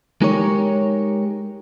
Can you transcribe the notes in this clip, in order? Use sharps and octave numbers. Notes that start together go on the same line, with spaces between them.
G#3 D#4 G4 A#4 C#5